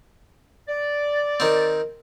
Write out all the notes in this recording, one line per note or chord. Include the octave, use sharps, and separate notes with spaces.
D5
D#3 C4